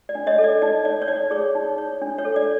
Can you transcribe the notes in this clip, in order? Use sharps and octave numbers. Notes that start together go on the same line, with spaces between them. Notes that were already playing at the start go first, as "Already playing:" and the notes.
D5
D4
C#5 D#5
A4
D5
D#4 D5
C#5 D5
C#5
D#4 D5
G#4 C#5
D#4
C#5
D4
C#5
A4
D5